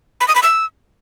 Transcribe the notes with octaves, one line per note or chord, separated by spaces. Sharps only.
B5
D#6
B5
E6